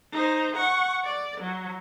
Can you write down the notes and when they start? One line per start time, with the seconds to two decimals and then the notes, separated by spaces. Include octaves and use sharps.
0.12 D#4 C5
0.55 F#5 C#6
1.04 D5
1.40 F#3